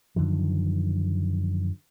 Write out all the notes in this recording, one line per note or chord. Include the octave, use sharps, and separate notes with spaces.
F#2 D3 D#3 F3